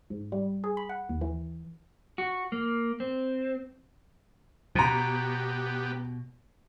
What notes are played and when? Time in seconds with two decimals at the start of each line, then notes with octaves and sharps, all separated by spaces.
0.10 G#2
0.32 G3
0.64 G#4
0.77 B5
0.89 F#5
1.09 D#2
1.21 E3
2.18 F#4
2.52 A#3
3.00 C4
4.75 B2 B3 G4 A#5 B5